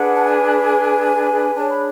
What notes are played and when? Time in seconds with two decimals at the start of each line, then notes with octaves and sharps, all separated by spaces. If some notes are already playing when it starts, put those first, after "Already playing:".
Already playing: D4 G#4 B4 F#5
0.15 A5
0.24 G#5
1.55 D4 G#4 C#5 A5
1.69 B5